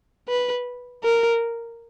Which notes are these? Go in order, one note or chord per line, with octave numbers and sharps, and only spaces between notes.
B4
A#4